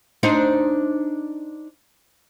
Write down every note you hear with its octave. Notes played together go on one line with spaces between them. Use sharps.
D4 D#4 C5